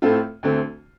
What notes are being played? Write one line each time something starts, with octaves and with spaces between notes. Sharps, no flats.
A2 A3 C4 F4 A4
D2 D3 A3 C4